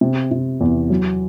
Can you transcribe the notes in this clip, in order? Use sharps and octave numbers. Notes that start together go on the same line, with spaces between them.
C3
C3
E2
F#3